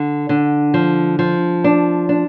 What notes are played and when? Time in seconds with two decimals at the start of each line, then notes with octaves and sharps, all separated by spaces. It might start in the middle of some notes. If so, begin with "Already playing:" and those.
Already playing: D3
0.29 D3
0.74 F3
1.19 F3
1.64 D4
2.09 D4